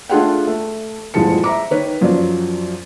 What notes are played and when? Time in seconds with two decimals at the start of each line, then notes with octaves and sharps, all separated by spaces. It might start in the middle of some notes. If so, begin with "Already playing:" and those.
0.09 A3 D4 F4 G#4 F#5 G5
0.47 A3
1.14 D#1 E2 F3 G#3 A5 C#7
1.44 E5 A#5 D6
1.71 D#3 B4 C#5
2.01 F#2 F3 F#3 D5